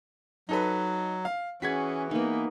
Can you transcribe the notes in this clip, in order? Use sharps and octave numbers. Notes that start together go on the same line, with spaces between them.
F#3 D#4 A4 B4
F5
E3 C#4 F#4 G#4 F#5 G#6 B6
A#3 B3 D#4